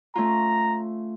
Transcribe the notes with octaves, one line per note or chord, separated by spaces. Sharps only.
A3 C#4 F4 A#5